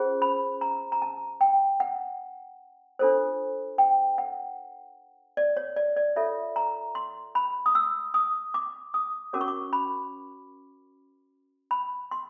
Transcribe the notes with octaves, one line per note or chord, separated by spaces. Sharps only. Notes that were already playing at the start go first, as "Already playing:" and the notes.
Already playing: C#4 F4 G#4 C5
B5
A#5
A#5
A5
G5
F#5
D4 F4 A4 C5
G5
F#5
D5
C#5
D5
D5
F4 A4 C#5 E5
A#5
C6
B5
D#6
E6
D#6
D6
D#6
C#4 F#4 A#4 C#5 D6
C#6
D6
B5
B5
C6